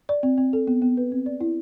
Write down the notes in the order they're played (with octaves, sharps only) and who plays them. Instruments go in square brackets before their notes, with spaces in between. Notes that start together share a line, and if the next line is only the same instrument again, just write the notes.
[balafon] D5
C4
C4
A4
B3
B3
B4
C4
D5
E4